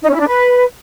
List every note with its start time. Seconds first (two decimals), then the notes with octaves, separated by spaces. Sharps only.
0.03 D#4
0.09 C#4
0.15 E4
0.21 D4
0.27 B4